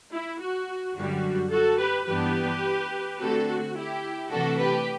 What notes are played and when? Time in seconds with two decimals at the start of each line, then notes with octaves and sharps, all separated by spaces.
0.11 E4
0.39 F#4
0.95 F#2 D3 G3 F#4
1.51 F#4 A4
1.80 G4 B4
2.07 G2 E3 B3 D4 G4 B4
3.20 D3 A3 C4 F#4 A4
3.48 F#4
3.76 E4 G4
4.32 C3 E3 A3 D4 F#4 A4
4.61 G4 B4